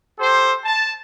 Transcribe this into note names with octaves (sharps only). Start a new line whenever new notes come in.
G4 A4 C5
A5